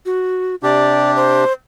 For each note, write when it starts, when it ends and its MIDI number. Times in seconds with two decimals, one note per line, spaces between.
0.06 0.55 66
0.63 1.44 48
0.63 1.44 62
0.63 1.44 67
0.63 1.11 74
1.16 1.53 72